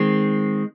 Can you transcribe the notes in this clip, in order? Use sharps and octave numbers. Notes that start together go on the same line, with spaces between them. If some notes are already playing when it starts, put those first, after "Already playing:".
Already playing: D#3 G#3 C4